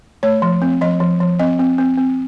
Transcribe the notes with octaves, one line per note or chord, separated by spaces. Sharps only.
A3 C#5
F3
C4
F3 D#5
F3
F3
C4 D#5
C4
C4
C4